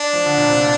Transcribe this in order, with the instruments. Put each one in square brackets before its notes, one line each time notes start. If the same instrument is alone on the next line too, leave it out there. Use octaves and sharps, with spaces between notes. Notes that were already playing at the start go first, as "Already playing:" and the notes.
Already playing: [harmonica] D4
[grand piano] F3
D3
A#2
C3
A#2